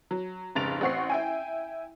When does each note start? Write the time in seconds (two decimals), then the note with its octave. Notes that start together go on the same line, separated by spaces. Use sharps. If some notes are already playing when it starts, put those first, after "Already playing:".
0.11 F#3
0.55 F1 G#2 C#3 A6 D7 F7
0.81 A1 C4 F#5 C#6 C7
1.10 E4 G5 G#5